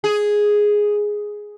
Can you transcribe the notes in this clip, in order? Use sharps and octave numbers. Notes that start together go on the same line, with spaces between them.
G#4